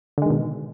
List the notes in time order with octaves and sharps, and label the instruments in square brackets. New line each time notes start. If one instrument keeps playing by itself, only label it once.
[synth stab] D3
G#3
D#3
B2